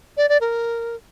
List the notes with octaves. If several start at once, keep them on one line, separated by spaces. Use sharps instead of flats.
D5
D5
A#4